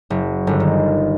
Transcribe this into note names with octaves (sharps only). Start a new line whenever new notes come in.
F#1
G1
D#3